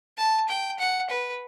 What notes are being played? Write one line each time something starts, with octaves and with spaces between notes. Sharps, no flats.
A5
G5
F#5
B4